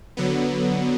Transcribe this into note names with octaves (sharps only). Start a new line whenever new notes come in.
D3 F#3 B3